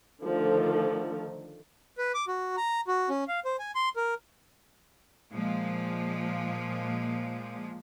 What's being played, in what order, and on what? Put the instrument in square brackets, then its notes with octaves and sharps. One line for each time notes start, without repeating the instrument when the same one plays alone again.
[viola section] D3 D#3 F3 A3 A4
[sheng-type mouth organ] B4
D6
F#4
A#5
F#4
C#4
F5
C5
G#5
C6
A#4
[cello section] A#2 F3 G#3